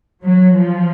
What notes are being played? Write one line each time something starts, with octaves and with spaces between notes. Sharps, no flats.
F#3
F3